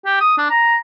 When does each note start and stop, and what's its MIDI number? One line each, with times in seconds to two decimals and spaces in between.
0.05 0.16 67
0.20 0.36 87
0.38 0.45 62
0.50 0.75 82